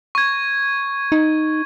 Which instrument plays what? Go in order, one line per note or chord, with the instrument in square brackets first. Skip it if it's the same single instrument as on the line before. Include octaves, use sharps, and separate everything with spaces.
[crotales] C#6 G#6
[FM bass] D#4